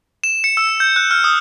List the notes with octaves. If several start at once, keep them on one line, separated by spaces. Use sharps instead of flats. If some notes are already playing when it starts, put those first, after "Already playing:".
E7
C#7
E6
G6
F#6
F6
D#6